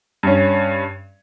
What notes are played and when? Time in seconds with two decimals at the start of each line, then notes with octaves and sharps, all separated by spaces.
0.23 G2 C#4